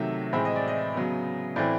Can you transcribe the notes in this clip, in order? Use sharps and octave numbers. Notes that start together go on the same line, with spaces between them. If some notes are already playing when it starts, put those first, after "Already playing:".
Already playing: C3 D#3 F#3 A3 E5
A2 E3 G#3 C4 E5
D#5
D5
D#5
C#3 F#3 B3
A2 E3 A3 C4 D5